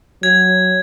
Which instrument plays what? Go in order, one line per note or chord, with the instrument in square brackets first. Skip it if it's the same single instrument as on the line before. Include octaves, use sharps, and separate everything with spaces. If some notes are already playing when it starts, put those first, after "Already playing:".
[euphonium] F#3 [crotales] G#6